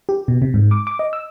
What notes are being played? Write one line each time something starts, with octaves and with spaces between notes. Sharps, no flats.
G4
B2
C3
G#2
D6
D6
D#5
E6